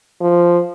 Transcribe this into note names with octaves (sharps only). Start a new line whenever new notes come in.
F3